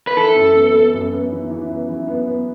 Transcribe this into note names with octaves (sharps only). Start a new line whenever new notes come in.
B4
E3 A4
F#2
B3
B3
F#2
B3
E3
E3
B3
E3
B3
B3